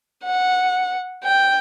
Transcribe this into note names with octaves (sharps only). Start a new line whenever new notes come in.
F#5
G5